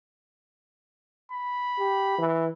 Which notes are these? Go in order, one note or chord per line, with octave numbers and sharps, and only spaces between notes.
B5
G4
E3